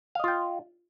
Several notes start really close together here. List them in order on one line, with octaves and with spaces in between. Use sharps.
F5 D#5 F4 G5